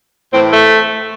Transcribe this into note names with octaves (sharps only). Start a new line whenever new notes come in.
A2 E3 C4
A3